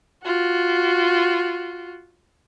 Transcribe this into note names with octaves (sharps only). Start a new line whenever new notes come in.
F4 F#4